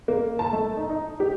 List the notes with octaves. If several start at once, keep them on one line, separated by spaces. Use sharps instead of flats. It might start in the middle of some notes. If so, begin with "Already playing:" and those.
A#3
A5
A3
D#4
D#4
G4